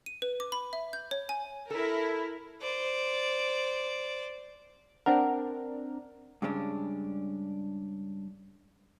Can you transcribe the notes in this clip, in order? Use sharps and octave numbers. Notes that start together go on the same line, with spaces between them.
D#7
B4
D6
B5
E5
G6
C#5
G#5
E4 A4 A#4
C5 D5
C4 D4 A#4 F#5
G2 C#3 G#3 C#4 D4